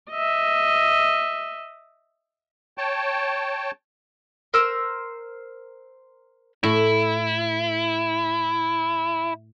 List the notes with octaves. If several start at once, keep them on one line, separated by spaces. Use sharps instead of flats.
D#5 E5
C#5 G5 A5
A#4 C5 E6
A2 E4